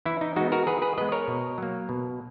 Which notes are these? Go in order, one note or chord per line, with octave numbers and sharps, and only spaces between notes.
E3 E4
D#4
G#3 B3 D#4 F#4
F#4 A#4
E3 G#4 B4
G#4 B4
G#3 B3 B4 D#5
A#4 C#5
B2
F#3 A#3
B2